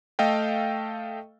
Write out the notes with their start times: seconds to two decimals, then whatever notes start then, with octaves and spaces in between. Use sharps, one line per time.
0.19 A3 A4 D#5 F5 G5